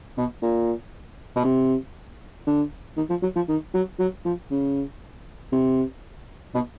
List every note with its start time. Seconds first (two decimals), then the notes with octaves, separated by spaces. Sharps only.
0.17 B2
0.42 A#2
1.36 B2
1.44 C3
2.47 D3
2.97 D#3
3.10 F3
3.22 F#3
3.36 F3
3.48 D#3
3.74 F#3
3.99 F#3
4.25 F3
4.51 C#3
5.52 C3
6.54 B2